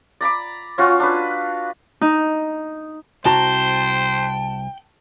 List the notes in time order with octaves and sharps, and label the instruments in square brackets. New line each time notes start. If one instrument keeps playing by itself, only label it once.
[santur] D5 A#5 B5 D6
C#4 F4 F#4
D4 B4
[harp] D#4
[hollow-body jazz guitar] C2 F#4 A#5 [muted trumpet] C5 [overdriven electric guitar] G5 [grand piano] A5